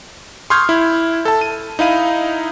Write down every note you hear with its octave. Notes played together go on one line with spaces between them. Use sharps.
C6 C#6 D#6 F6 G6 G#6
E4
A4 A5
D#7
D#4 E4 F5 D#7